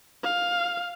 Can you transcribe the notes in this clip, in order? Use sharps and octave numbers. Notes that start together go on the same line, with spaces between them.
F5